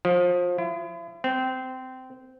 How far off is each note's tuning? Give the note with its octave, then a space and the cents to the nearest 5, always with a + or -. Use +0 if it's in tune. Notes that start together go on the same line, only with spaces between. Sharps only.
F3 +25
E4 +40
C4 -20